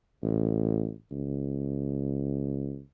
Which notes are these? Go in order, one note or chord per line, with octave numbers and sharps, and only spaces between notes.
A1
C#2